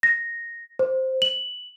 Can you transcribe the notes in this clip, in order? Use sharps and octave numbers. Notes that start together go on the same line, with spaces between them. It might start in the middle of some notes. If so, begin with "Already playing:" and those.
A#6
C5
F#7